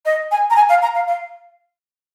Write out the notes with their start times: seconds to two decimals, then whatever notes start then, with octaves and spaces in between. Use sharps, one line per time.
0.05 D#5
0.31 G#5
0.50 A#5
0.56 G#5
0.69 F5
0.82 A#5
0.95 F5
1.07 F5